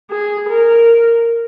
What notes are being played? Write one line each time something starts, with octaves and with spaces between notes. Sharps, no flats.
G#4
A#4